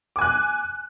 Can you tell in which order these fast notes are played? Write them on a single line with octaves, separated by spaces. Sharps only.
D6 G#5 F#6